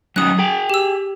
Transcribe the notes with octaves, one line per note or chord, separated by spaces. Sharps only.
F#3 C#4 D#4 D#6 F#6
G#4 G5
G4 E6